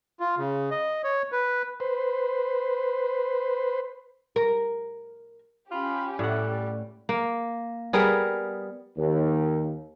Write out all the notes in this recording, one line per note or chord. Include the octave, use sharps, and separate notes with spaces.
F4
C#3
D#5
C#5
B4
B4 C5
A#4
C#4 F4 G4 B5
A2 G3 A4 F#5
A#3
G3 B3 G#4 A#4
D#2